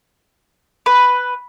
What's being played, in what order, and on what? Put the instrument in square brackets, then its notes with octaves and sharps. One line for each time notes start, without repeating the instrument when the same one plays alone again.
[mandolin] B4